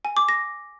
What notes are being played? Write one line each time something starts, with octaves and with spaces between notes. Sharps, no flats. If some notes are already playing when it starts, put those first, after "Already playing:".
G#5
D6
A#6